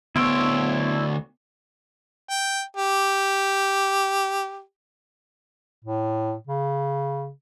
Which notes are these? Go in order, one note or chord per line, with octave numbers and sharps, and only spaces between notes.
D2 B3 E4 C#5 C6 E6 D7
G5
G4
A2
C#3